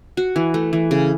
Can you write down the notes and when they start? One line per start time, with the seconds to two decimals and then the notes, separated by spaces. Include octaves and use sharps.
0.17 F#4
0.36 E3
0.54 A3
0.73 E3
0.91 C#3